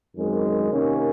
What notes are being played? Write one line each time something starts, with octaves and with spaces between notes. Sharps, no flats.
F#2 D#3 G#3 C4
C3 D#3 A#3 C#4